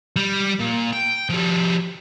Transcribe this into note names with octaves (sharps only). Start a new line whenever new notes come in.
G3
A#2
G5
F3 G3